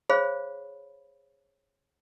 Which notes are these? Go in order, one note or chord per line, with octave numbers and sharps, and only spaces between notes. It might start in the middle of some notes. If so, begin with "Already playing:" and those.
G#4 C5 C#5 F5 B5